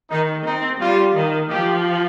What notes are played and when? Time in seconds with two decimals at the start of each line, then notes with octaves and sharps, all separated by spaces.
0.10 D#3 D#4
0.46 C4 D#4
0.80 G3 F4
1.15 D#3
1.50 F3 G4